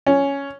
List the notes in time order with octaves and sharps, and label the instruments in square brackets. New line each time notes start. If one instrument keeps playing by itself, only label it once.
[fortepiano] C#4